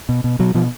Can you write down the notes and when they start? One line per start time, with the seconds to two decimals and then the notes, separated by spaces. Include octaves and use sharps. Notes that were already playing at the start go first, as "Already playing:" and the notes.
0.09 B2
0.24 B2
0.39 B2 F#3
0.54 B2 F3